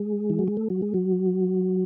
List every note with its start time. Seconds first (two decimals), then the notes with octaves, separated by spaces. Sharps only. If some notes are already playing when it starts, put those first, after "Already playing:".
Already playing: G#3
0.30 E3
0.39 F#3
0.48 G#3
0.57 A3
0.70 F#3
0.82 G#3
0.94 F#3